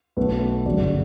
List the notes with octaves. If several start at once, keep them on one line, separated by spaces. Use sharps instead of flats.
B1 B2 A3 B4
G1 F#2 C#3 F#3 D5